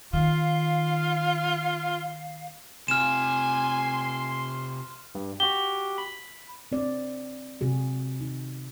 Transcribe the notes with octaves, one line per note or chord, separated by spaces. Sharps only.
D#3 F4 F5
C3 F4 G#5 C6 F6 E7
G2
F#4 G4 G7
B5
C4 D5
C3 F#4 G#4
D#4